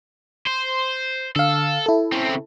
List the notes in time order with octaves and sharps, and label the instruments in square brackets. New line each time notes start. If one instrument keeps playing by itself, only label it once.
[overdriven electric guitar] C5
[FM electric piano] D3 F5 [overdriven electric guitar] A4
[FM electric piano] E4 A4
[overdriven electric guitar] C#3 C4